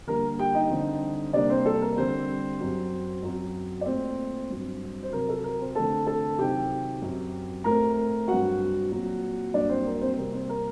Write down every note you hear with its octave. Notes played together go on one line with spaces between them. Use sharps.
D3 G3 A#3 A#4 A#5
G4 G5
D#4 D#5
D3 G3 C4
C3 G3 A#3 D4 D5
C4 C5
A4
A#4
D3 G3 C4 C5
F#2 F#3 C4
F#2 F#3 C4
D5
A#2 A3 C4 C5
G2 F#3 C4
C5
C3 F#3 C4 A#4
A4
A#4
C4 C5
D3 A3 C4 A4 A5
A4 A5
C3 D#3 F#3 C4 G4 G5
F#2 F#3 C4
A2 A3 C4 A#4 A#5
G2 F#3 C4 F#4 F#5
A#2 F#3 C4
G2 F#3 A#3 D4 D5
C4 C5
A#4
C4 C5
C5
C3 G3 A#3 A#4
C4 C5
A#4